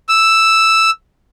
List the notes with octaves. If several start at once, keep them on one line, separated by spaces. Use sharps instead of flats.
E6